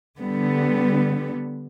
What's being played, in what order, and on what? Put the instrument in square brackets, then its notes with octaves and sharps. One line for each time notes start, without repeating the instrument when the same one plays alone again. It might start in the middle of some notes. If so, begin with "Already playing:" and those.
[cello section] D3 G3 B3